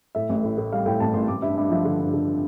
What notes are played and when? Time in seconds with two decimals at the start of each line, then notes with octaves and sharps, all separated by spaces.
0.15 A2 E5
0.29 A1
0.43 A2
0.58 A2
0.72 G3 F5
0.86 A2 G5
1.00 A1 A5
1.14 A1 C6
1.28 A1 D6
1.42 G2 E5
1.57 G2 E5
1.71 F3 E5
1.85 D3
2.00 G2
2.13 D3